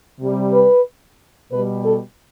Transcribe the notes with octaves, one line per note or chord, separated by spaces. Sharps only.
C3 G3
B4
B2 G3 B4
A4